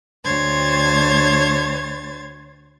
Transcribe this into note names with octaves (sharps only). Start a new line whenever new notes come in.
D2 C5 C#5 G#6 A6